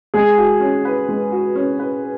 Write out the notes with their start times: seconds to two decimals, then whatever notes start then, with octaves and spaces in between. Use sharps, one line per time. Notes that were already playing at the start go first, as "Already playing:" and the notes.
0.14 G#3 G#4 G#5
0.38 F#4
0.60 C#4
0.85 B4
1.09 G#3
1.32 F#4
1.55 C#4
1.79 B4